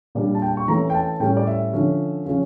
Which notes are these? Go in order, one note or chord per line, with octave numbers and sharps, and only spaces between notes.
A#2 G3 D4 D5
A5
G5
C#6
E3 A3 C#4 A#5
G5
A5
A2 G3 C#4 G5
D5
E5
D3 F3 C#4
C#3 F3 C#4